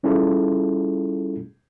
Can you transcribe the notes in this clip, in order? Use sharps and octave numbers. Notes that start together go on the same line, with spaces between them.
G3 C#4 E4 F4 G#4 A4